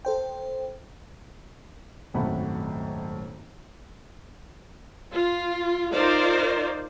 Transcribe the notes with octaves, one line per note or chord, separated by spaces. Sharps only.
A4 C5 G5
D#1 G#1 F#2 A3 F#5 B5
F4
D#4 F4 A#4 C5 D5